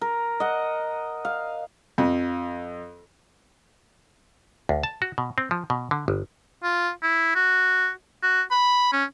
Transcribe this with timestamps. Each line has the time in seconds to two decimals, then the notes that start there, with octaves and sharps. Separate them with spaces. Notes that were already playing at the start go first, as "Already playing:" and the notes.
0.01 A#4
0.40 D#5 F#5
1.25 F5
1.98 F2
4.69 D2
4.83 A5
5.02 F#4
5.18 B2
5.38 C4
5.51 F3
5.70 B2
5.91 D3
6.08 G1
6.63 F4
7.03 E4
7.35 F#4
8.23 F#4
8.51 B5
8.93 C#4